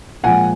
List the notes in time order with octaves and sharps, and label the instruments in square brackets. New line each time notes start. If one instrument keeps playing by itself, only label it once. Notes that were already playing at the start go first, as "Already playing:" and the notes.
[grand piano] A#2 F3 G#3 F#5 G#5